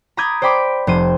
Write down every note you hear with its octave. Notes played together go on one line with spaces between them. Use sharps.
A#5 B5 D6 D#6 G6 G#6
C5 D5 G5 B5 D6
F1 C5 D#7